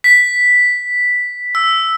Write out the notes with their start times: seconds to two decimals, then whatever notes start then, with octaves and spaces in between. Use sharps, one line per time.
0.04 B6
1.55 E6